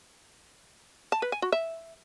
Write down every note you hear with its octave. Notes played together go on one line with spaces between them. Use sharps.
A5
B4
G#5
F#4
E5